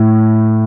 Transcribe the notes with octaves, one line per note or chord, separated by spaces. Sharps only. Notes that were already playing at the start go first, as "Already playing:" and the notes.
Already playing: A2